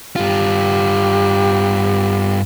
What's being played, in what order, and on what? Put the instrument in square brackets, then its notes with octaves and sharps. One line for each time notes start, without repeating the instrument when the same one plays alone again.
[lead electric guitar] G2 F4 [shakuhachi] G4